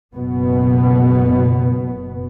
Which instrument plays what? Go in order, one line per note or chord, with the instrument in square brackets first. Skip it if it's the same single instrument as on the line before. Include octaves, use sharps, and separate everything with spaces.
[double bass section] F#1 B2 B3